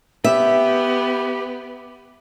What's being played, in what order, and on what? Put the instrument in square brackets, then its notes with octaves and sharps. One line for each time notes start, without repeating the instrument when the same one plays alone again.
[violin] B3 [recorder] G4 [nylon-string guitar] E5